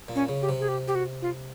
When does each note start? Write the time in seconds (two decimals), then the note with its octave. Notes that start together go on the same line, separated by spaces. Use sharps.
0.08 A#2
0.15 C#4
0.29 C#3
0.42 G4
0.49 C3
0.60 G#4
0.68 G4
0.87 G4
0.95 F#4
1.22 F4